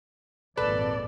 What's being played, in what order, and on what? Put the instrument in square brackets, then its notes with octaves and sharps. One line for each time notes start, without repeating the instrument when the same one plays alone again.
[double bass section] G#1 F2 A#2 [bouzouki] A4 [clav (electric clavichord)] B4 [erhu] D5